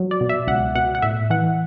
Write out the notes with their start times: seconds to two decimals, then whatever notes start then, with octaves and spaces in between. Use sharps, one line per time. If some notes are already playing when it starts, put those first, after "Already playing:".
Already playing: F#3
0.11 D5
0.21 B2
0.29 E5
0.47 C#2 F#5
0.75 B2 F#5
0.95 F#5
1.02 A2 E5
1.30 E3 F#5